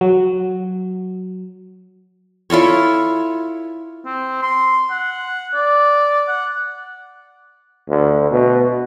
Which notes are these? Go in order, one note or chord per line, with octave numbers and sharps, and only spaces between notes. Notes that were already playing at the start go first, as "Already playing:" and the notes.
F#3
E4 F4 A4 C#5
C4
C6
F#5
D5
F#5
D2
B2